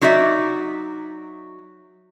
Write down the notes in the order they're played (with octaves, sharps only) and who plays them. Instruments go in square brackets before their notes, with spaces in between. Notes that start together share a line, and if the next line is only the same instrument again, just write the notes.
[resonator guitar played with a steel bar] F#3 D#4 F#4 D5 E5